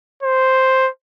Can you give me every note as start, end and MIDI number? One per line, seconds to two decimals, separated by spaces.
0.23 0.88 72